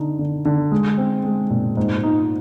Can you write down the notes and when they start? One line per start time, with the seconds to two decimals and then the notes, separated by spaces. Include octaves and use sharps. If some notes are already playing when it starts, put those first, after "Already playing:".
Already playing: D3 D#4
0.19 D3
0.45 D3
0.72 G#3
0.98 C4
1.24 G#3
1.50 A#2
1.77 G#2
2.03 D#4